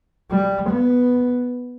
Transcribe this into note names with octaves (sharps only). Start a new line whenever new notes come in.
G3
B3